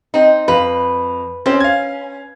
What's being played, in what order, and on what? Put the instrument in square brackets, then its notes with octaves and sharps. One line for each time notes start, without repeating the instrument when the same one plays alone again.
[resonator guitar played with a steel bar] C4 D#4
[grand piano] F2 F5 [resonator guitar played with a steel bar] B4
[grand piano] C4 G4 C5 [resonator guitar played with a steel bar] C#4
[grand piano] F5 G#6